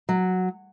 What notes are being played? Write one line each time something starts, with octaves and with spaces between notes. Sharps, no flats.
F#3